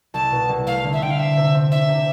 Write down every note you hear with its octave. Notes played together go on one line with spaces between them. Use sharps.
C2 A5
B2
C2
A3 F5
D3
E5
D3 G5
F5
C3 E5
C3
C4
D4 E5
C3